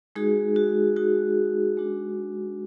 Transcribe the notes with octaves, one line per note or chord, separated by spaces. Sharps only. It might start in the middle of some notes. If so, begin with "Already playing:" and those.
G#3 D#4 F#4 G#4
F#4
G#3 D#4 F#4
G#3 D4 F#4